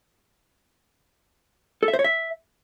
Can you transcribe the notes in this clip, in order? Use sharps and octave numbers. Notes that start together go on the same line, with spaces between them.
A4
E5
C5
C#5
E5